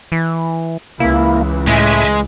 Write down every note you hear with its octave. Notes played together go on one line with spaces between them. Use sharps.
E3
C#2 E3 A#3 E4
A2 G#3 E5 G#5